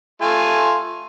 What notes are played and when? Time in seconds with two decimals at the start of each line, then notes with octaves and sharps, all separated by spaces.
0.22 A3 F4 G#5